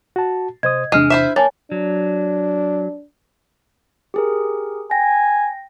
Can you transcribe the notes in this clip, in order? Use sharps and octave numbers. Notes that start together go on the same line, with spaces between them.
F#4 A5
C3 C5 D#5 D#6 G#6
E2 C3 G#3 D4 F6 D#7
E4 C5 E5
A#3 C#5 G#5 A5 A6
F#3 D4
G4 G#4 A#4
G5 G#5 A#6